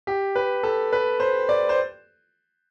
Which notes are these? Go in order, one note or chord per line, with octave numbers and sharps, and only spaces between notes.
G4
B4
A4
B4
C5
D5
C5